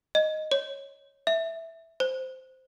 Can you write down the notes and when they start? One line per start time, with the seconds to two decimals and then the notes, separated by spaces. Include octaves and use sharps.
0.15 D#5
0.52 C#5
1.27 E5
2.00 C5